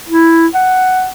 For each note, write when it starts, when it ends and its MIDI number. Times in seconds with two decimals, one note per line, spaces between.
0.09 0.47 64
0.54 1.08 78